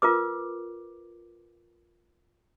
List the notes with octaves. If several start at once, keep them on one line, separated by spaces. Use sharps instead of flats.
F4 A#4 B4 D6